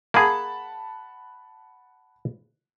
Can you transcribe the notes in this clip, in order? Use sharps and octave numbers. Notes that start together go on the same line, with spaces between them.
A#3 G#4 F#5 A5 B5